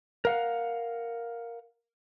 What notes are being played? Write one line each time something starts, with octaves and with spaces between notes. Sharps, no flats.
A#4 F5 F#5